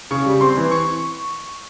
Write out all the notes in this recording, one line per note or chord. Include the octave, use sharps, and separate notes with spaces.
C#3 C#6
G3
C4 C6
E3
C#6